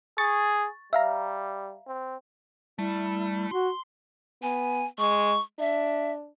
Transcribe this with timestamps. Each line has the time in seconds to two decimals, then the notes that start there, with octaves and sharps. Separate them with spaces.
0.18 G#4 C#6 A6
0.93 G3 E5 F5 A#5
1.87 C4
2.79 G3 A3 E4
3.51 F#4 C6
4.42 B3 G#5
4.99 G#3 C#6
5.59 D4 E5